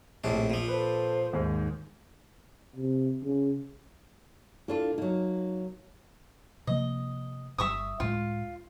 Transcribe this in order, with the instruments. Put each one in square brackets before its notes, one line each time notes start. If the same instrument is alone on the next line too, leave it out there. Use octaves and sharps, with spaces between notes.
[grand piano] A#1 [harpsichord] A2 C3 D4
[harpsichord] A#2 F3
[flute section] A4 C5 [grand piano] B4
[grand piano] D#2 G#2
[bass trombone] C3
C#3
[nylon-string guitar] A#3 D4 F4 [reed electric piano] E4 A4
[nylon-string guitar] F#3 A#3 [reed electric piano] D#4
[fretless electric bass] C3 F3 A#3 [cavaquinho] D#5
[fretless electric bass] G1 C#3 G3 [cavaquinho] E5 C#6 D#6
[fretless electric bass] C#2 A2 G#3 [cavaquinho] F4